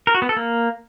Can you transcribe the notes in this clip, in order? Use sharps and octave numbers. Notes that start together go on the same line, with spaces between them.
A#4
F#4
B3
A4
A#3